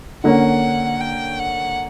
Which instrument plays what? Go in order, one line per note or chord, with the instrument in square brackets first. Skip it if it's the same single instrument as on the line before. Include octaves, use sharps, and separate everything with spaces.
[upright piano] D3 A#3 C#4 [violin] F#5
[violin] G5
F#5